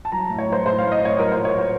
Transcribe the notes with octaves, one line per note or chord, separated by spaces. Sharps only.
A5
F#3 A#5
A2
C#5
F#3 C5
A2 C5
F5
A2
D#5
A2 C#5
F#3 A#4
A#2 C5
C#5
A#3 C5